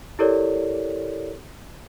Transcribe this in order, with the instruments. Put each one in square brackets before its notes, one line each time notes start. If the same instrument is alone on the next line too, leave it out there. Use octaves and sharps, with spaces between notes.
[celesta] E4 G4 A4 A#4 C#5 D5